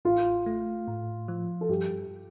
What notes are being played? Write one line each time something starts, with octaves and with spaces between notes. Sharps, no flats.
A1 F4
A3
A2
F3
A4
G2 G4